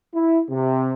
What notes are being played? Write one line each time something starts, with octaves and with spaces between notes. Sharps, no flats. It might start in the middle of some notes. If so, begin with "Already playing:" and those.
E4
C3